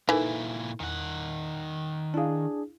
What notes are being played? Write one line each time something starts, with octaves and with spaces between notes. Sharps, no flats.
A#2 E3 D#4 E4 A4 A#4
E2 D#3 F#5
D4 E4 G#4 F5